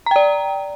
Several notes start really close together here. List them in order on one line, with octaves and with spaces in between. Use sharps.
A#5 G5 D5